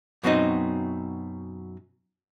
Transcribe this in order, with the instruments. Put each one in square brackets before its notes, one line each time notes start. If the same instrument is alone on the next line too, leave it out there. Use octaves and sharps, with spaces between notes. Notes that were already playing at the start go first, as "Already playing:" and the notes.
[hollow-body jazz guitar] F#2 B2 F#3 C4 D#4